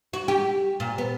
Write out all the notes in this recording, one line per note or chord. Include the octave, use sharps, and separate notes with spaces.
F#4
G4
A#2
B3